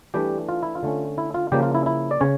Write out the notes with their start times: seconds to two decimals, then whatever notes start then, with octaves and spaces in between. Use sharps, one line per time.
0.14 E3 G3 A3 D4 G4
0.49 F4
0.63 E4
0.75 F4
0.83 D3 A3 C#4
1.18 E4
1.34 F4
1.52 C#3 F3 G3 A#3 G4
1.63 F4
1.75 E4
1.86 E4
2.11 D5
2.21 C#3 C#4 C#5